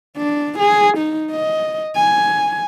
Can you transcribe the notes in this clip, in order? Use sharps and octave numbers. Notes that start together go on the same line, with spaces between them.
D4
G#4
D#4
D#5
G#5